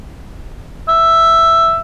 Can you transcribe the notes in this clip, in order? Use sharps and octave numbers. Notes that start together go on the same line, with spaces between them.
E5